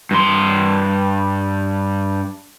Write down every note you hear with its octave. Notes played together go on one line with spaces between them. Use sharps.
G2 C6